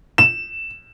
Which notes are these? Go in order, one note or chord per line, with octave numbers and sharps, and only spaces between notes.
E7